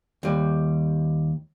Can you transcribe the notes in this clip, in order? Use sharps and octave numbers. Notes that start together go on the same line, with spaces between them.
D#2 G3